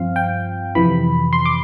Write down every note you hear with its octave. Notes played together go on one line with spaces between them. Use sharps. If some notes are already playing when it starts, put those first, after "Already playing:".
Already playing: G2 F3 C4 F5
G5
F2 C3 E3 B5
C6
D6